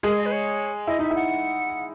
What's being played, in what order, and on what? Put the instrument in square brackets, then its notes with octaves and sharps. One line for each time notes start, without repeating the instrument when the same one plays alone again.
[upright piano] G#3 G#4 [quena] A#4
[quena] D#5
B4
C#5
[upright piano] E4 [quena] D#5
[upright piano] D#4 [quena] E5
[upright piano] E4 [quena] F#5